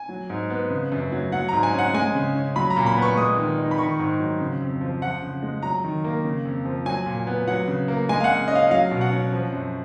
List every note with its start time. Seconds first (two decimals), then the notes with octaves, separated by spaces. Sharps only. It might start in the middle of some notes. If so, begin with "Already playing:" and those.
Already playing: G#5
0.09 F#3
0.30 G#2
0.50 B3
0.70 C#3
0.92 F#2
1.12 F#3
1.32 F#3 F#5
1.48 G#2 A#5
1.63 G#5
1.73 C#4
1.79 F#5
1.94 G#3 G#5
2.15 C#3
2.35 C#4
2.56 F#3 B5
2.70 A#5
2.76 A#2
2.86 B5
2.97 B3
3.02 C#6
3.17 G#3 D#6
3.37 D#3
3.58 D#4
3.71 B5
3.78 D#3 C#6
3.99 G#2
4.20 F#3
4.40 C#3
4.61 F2
4.81 F3
5.02 F3 F#5
5.22 C#3
5.43 G#3
5.63 F#3 A#5
5.84 D#3
6.04 A#3
6.24 C#3
6.45 F2
6.65 F3
6.86 F#3 G#5
7.06 A#2
7.27 B3
7.47 F#3 F#5
7.68 C#3
7.88 A#3
8.09 G#3 G#5
8.20 F5
8.24 F#5
8.29 C#3
8.48 D#5
8.51 C#4 F5
8.71 F#3 F5
8.91 B2
9.01 F#5
9.12 C#4
9.32 F3
9.52 F#2